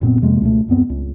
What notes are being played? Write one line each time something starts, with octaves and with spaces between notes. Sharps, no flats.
F#1 A#2 B3 C4
F2 C3 G#3 A#3
C#2 B2 A3
C#2 F#2 B3 C4
C#2